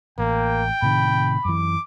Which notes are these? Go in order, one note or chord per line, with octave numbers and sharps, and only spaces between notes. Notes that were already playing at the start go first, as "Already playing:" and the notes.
A1 A#3 G5
A2 C3 D#3 B5
F#2 E3 D6